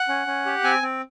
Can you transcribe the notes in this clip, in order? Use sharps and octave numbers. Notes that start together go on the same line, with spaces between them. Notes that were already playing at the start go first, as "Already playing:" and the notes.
Already playing: F#5
C#4
C#4
G4
C4 G#5
C4